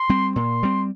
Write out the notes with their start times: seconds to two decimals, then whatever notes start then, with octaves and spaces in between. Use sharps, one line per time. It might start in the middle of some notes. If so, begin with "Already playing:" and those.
Already playing: C6
0.09 G3 C4
0.36 A#2 C6
0.63 G3 C4